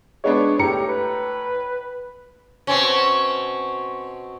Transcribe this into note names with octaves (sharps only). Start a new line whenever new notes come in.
G#3 B3 D4 C#5
A2 G4 A#5 C#7
B4
B2 C4 C#4